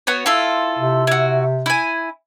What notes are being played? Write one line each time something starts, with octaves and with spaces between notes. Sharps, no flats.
B3 F#4 C#5
E4 F4 A4
C3
E4 F#4
E4 G#5